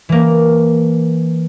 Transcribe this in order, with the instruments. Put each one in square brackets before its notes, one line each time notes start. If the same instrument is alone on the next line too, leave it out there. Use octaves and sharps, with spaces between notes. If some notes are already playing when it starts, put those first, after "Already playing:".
[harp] E3 A#3